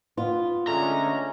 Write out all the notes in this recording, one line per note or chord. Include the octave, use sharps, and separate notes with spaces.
B3 F4
D3 G#3 A3 C#4 A#5